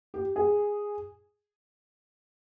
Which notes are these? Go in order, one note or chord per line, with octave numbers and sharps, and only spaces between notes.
G4
G#4